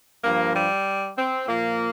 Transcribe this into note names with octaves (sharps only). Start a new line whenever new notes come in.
G2 F3 A#3
G3
C4
A#2 F3 A#3